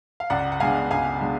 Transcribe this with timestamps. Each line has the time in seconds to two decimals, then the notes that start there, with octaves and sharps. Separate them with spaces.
0.20 F5
0.30 C#2 D5 F#5
0.52 F#5
0.60 B2 G#3 D4 F5 G#5
0.91 C#2 F5 G#5
1.21 B2 G#3 D4